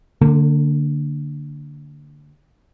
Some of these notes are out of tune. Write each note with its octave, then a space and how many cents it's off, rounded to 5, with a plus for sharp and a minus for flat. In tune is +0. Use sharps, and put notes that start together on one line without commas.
D3 +0 A#3 -45